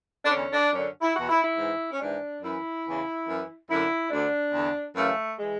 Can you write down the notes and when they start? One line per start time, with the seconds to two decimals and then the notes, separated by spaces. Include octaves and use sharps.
0.23 D4
0.31 E2 D3 C#4
0.53 D4
0.73 F#2 D3 C#4
1.02 E4
1.15 E2 B2 F#4
1.29 E4
1.44 E4
1.57 G#2 E3
1.92 C#4
2.00 G#2 E3 D4
2.42 F#2 E3 E4
2.85 E2 C#3 E3
3.27 F#2 E3
3.69 F#2 D3 E4
4.11 D2 D3 D4
4.53 E2 D3
4.95 F#2 C#3 E3 A3
5.38 E3 G#3